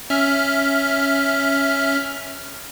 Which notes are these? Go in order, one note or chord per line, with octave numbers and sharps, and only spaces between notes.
C#4 E5 F6